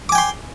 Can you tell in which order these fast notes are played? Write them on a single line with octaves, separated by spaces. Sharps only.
D6 G#5 G5 C6